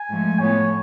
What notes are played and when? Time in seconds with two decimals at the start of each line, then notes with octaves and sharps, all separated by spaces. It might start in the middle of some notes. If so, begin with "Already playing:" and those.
Already playing: G#5
0.10 G#2 F3 A3
0.39 A2 F3 B3 C#5